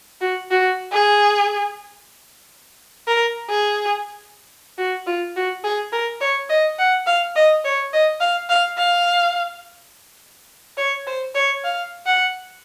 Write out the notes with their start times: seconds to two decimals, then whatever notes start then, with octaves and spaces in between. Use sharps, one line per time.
0.21 F#4
0.51 F#4
0.92 G#4
3.07 A#4
3.49 G#4
4.78 F#4
5.07 F4
5.36 F#4
5.64 G#4
5.92 A#4
6.21 C#5
6.49 D#5
6.79 F#5
7.07 F5
7.36 D#5
7.64 C#5
7.93 D#5
8.20 F5
8.49 F5
8.77 F5
10.77 C#5
11.07 C5
11.35 C#5
11.64 F5
12.06 F#5